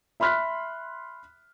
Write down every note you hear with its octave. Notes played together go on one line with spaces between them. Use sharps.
E5 B5 C6 F6 F#6 B6